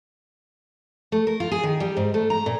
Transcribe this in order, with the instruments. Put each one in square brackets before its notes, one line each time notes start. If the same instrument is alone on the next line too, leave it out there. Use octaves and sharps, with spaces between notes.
[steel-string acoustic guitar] A3
A#4
F4
G#4
D#3
G3
G#2
A3
A#5
A#2